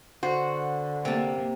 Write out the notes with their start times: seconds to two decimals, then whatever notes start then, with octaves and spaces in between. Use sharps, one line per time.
0.23 D3 F#4 C5
1.05 C3 A#3 A5